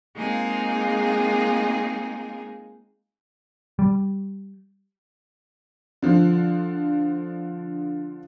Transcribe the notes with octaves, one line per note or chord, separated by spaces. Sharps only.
G#3 A#3 C4 D#4 F4 G#4
G3
D3 F3